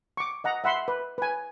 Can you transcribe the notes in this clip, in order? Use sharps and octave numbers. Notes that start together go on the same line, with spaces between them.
C#6 D6
D#5 F#5 A#5
E5 F#5 B5 C6
B4
B4 G#5